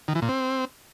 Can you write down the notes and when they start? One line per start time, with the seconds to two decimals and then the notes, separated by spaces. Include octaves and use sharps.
0.08 D#3
0.15 E3
0.22 A#2
0.29 C4